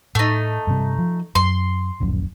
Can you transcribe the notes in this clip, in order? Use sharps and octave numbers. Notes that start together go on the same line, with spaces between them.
A2 A3 D#4
G2 C3 G3
F3
F#2 C6
D1 A#1 F#2